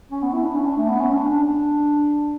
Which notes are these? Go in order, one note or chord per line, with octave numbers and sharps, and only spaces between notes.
C#4
B3
E4
D4
C#4
D4
A3
B3
C#4
D4
D4
D4